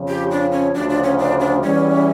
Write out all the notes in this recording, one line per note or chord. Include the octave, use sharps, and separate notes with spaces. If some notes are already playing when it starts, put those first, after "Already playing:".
Already playing: F2 C#3 F3
G4
D4
C#4
D2 C#3 F3 D4
D4
C#4
D4
D4
E2 E3 G3 C#4